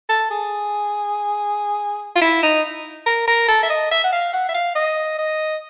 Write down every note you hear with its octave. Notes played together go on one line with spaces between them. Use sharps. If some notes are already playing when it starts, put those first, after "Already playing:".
A4
G#4
F4
E4
D#4
A#4
A#4
A4
E5
D#5
E5
F#5
F5
F#5
E5
F5
D#5
D#5